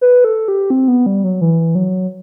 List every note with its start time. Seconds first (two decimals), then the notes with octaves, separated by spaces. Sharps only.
0.01 B4
0.24 A4
0.48 G4
0.70 C4
0.88 B3
1.06 G3
1.24 F#3
1.41 E3
1.75 F#3